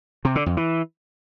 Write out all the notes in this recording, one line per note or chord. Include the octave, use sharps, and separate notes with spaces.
C3
D3
F2
E3